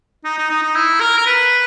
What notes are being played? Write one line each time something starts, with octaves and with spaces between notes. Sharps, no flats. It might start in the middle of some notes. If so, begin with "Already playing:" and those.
D#4
D#4
D#4
D#4
E4
A#4
A#4
B4